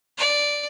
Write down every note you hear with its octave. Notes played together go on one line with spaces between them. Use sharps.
D5